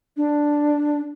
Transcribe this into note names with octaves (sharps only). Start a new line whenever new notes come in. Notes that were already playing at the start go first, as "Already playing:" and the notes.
D4